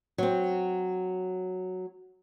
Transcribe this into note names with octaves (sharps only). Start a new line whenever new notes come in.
F#3 C4